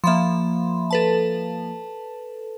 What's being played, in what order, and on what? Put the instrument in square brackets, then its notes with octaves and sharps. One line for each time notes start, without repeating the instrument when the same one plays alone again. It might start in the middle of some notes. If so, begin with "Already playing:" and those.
[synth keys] F3 A#3 [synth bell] E5 B5 C6
[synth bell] A4 B4 A5